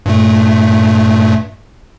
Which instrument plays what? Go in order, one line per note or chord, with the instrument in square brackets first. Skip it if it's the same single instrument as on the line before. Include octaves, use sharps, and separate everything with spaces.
[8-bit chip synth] G2 A#2 A3